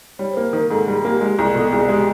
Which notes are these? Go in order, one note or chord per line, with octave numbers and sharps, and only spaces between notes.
G3 C#5
C5
A#3
C5
D#3 A#4
G#2 A4
G3 G#4
A#3 G4
G#3 G4
C2 G#4
B2 A4
C2 G#4
G#3 G4